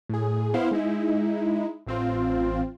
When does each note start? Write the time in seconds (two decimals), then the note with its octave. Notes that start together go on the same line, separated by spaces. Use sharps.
0.09 A2 G#4
0.54 B3 E4 C5 F5
0.71 G#3 D#4 E4
1.87 A1 C4 F4